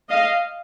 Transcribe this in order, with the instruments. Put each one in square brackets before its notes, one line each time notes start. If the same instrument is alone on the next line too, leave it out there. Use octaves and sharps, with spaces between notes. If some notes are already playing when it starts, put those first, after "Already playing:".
[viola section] D#5 F5